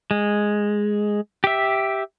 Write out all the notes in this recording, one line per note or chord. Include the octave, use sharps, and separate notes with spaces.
G#3
G4 E5